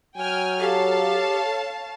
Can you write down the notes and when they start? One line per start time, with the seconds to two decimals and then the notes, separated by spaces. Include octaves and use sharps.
0.17 F#3 G5 G#5 F6
0.60 G4 A4 C#5 F5 A5